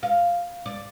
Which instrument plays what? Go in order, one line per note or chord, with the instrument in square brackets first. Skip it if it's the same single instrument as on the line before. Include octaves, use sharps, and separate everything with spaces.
[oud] F5
D5